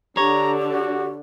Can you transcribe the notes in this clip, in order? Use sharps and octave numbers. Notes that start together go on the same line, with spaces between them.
D3 G4 C#5 A#5
F#4